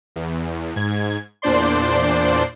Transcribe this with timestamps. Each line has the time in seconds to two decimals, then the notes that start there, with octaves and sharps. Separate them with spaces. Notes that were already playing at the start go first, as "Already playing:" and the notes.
0.16 E2
0.76 G#2 G#6
1.42 E2 A#2 D4 C5 D5 C6